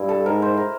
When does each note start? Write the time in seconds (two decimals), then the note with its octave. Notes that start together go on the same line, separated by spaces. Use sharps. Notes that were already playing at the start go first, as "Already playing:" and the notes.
Already playing: G2 E4
0.09 A4
0.26 G#2 A#4
0.42 C5
0.57 A#4